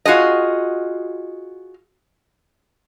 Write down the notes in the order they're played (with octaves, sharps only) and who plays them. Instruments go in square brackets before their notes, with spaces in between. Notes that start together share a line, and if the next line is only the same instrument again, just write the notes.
[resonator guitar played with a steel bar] F4 F#4 G#4 D#5